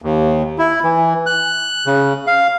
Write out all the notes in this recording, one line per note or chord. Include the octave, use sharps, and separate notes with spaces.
D#2
E4
E3
F#6
C#3
F5